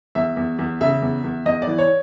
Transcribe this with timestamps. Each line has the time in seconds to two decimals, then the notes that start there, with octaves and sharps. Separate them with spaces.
0.15 E2 E5
0.37 E2
0.59 E2
0.81 C#3 E5
1.02 E2
1.24 E2
1.46 E2 D#5
1.62 D5
1.67 E3
1.78 C#5